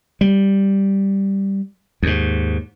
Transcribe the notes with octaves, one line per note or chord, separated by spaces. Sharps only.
G3
D#2 G#2